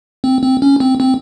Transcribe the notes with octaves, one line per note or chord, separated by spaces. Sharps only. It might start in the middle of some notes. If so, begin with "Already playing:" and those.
C4
C4
C#4
C4
C4